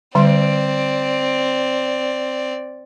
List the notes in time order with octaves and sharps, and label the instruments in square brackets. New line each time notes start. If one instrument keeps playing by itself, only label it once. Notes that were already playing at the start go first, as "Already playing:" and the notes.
[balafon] D3 G3 C6 [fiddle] C4 D5